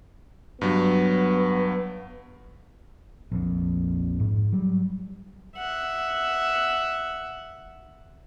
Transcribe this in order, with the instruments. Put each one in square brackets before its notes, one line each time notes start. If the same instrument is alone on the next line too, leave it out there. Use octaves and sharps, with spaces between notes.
[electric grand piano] G2 F#3 [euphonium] B3
[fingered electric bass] A#1 F2
G#2
F#3 G3
[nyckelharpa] E5 F#5